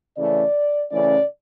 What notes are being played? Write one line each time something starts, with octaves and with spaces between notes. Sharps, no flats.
C#3 E3 A3 C#4 D5
C#3 E3 A3 C#4 D5